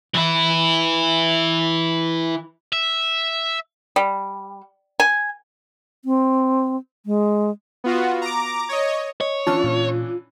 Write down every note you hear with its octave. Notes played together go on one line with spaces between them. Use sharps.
E3 E4
E5
G3
G#5
C4
G#3
B3 F4 F#4
A#5 D6
C#5 D#5
C#5 D#5
E3 C#4 D4 F4 A5 C#6 F6
A#2